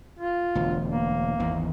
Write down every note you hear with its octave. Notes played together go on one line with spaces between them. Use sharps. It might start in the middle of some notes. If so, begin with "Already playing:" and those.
F4
E1 D2
A#3
G#1 E2 D#3